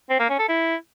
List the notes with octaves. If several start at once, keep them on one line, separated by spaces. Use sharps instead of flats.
C4
A#3
C#4
A4
E4